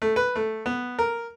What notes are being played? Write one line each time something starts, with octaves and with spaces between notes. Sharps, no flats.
A3
B4
A3
B3
A#4